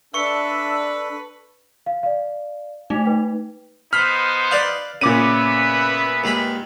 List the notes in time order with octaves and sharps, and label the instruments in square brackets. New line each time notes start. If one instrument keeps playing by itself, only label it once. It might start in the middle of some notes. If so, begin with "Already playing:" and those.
[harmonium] D4 A4 [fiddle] B4 [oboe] E5 [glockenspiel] C#6 C#7
[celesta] F5
D5 F5
[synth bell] A3 D#4
[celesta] B4 G5
[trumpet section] B3 D#4 C5 [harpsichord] B5 [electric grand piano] F6
[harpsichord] B4 D5 F5
[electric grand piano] A#2 D6 D#7 [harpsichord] C#3 [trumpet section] B3 B4 E5
[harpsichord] D#2 G#3 B5